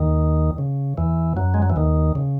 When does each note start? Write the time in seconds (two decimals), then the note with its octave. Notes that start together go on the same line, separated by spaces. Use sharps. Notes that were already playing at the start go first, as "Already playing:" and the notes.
Already playing: D#2 D#3
0.58 C#3
0.97 E2 E3
1.37 F#2 F#3
1.54 G#3
1.62 F#3
1.70 E3
1.76 D#2 D#3
2.15 C#3